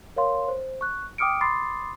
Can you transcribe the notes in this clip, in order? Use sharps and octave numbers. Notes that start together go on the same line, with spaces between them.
A#4 C#5 F5 C6
C5
C#6 F#6
G5 D6 D#6 F6 C#7 D7
B5 C6 D6 D#6 A6 C7